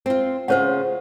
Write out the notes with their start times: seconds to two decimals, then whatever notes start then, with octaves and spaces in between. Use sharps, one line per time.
0.06 C4 F4
0.48 C#3 C#4 F4 C5 C#5 F#5